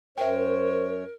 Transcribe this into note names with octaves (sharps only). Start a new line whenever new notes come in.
F#2 A#4 C5 C#5 E5 G5